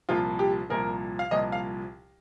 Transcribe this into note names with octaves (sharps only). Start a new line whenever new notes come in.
C2 A#2 F3 F4
G4
C2 A#2 F3 A#4
F5
C2 A#2 F3 D#5
F5